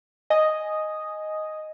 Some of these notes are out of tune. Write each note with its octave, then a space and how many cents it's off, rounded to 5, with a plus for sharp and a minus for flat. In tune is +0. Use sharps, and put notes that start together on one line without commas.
D#5 +0 G#5 +0 D#6 +0